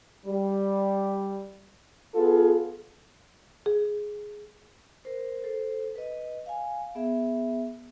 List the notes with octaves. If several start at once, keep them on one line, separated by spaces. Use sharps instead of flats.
G3
B3 F4 G#4 A4
G#4
A#4 C5
A4 C5
B4 D#5
F5 G#5
B3 G#4 E5